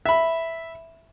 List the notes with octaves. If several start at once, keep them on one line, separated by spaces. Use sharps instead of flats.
E5 B5